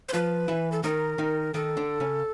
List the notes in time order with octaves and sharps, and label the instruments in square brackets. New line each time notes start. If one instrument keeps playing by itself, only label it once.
[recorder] C5
[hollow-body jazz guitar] F3 F4 [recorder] B4
[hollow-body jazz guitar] E3 E4
[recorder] A4
[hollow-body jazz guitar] D#3 D#4 [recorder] A#4
[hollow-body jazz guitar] D#3 D#4
[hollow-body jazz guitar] D#3 D#4 [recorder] A4
[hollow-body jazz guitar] D3 D4
C#3 C#4